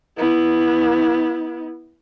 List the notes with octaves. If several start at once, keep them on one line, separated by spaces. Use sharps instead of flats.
B3 E4